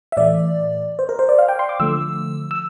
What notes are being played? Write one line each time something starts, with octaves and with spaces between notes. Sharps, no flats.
E5
A2 E3 A3 D5
C5
A#4
C5
D5
F5
G5
C6
D6
D3 F3 A3 E6
E6